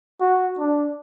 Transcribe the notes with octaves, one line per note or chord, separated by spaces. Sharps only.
F#4
D4